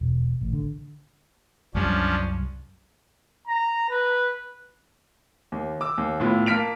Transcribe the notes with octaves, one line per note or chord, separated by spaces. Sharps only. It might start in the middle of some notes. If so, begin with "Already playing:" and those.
E1
A1
D3
C2 F#2 F3 G3 C#4 D4
A#5
B4
D#2
D6 E6
D#2
A2 B3 E4 F4
A#3 A5 F6 B6 D7 F7